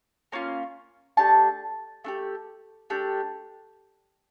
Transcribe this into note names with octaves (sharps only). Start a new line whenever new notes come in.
A#3 C#4 F4
A3 D4 G4 A5
A3 D4 G4
A3 D4 G4